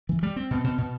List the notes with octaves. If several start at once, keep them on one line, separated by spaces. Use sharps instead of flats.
E3
G3
C4
B2
B2
B2